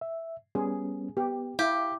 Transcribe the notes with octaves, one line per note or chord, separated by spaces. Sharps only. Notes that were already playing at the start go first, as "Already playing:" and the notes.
E5
G3 B3 C#4 G#4
B3 G4
E4 G4 F5 D6